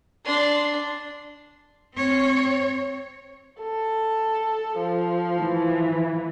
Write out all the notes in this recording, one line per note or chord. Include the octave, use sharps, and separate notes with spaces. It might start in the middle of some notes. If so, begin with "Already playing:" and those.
D4 C6
C4 C#5
A4
F3
E3